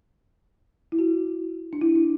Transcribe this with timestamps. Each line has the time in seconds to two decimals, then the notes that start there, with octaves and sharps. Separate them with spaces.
0.92 E4
0.99 F#4
1.73 D4
1.81 E4
1.95 D4